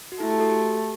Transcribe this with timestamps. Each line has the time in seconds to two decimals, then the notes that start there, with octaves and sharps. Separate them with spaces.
0.12 F#4
0.20 A3 E4
0.30 G4
0.40 F#4 A4
0.50 G4